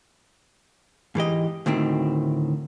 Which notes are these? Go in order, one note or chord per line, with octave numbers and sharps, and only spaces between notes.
G#2 E3 G4 D#5
D2 A2 D#3 C4